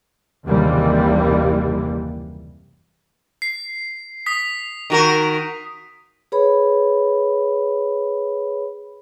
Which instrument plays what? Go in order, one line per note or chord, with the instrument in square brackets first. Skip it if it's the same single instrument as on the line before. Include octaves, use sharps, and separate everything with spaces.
[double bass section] F#1 D#2 C3 E3 G3 A#3
[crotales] C7
D#6 B6
[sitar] D#3 F#4 A#4
[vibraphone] G#4 B4 C#5 B5